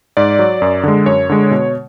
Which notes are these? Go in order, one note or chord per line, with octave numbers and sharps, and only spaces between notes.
G#2 D5
F#3
F#2
D3 G#3
F#2 C#5
D3 G#3
B2